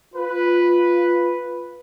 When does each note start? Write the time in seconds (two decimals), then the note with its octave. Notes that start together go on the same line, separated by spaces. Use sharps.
0.15 F4 B4